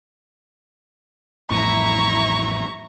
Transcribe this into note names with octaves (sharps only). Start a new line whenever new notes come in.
A1 F2 A2 E4 E5 A#5 C#6